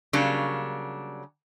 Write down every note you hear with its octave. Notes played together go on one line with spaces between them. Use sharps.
C#3 F#3 G3 A#3 D4